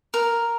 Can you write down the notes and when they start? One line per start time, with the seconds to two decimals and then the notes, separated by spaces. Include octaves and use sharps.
0.14 A#4